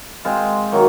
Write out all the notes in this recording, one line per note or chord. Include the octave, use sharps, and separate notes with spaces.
G#3 C4 F4 C5
D#3 F#3 A#3